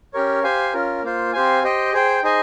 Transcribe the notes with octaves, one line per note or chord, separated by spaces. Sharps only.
C#4 G4 A#4 C#5
G4 C5 F5 G#5
C#4 F4 A#4
A#3 F4 C5
C4 G4 C5 F5 G#5
G4 C5 D#5 G5
G#4 C5 G5
D#4 G#4 C5 D#5 G#5